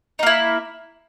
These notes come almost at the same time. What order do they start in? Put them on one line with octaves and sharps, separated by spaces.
D#4 A#3 E4